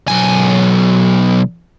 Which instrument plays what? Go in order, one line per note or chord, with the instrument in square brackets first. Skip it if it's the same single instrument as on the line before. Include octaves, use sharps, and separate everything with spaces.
[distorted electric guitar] B1 G#5